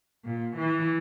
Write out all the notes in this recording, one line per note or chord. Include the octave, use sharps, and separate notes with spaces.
A#2
E3